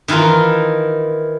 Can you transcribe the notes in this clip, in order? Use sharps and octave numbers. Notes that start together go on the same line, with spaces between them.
D#3 E3 E4 F4 A#4